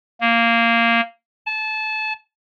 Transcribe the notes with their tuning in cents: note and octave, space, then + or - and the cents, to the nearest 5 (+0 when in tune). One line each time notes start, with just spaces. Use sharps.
A#3 -10
A5 -25